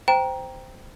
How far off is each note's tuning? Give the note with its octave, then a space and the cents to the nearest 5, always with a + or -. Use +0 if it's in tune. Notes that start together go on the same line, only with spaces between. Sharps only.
C5 -15 G5 +0 A#5 +15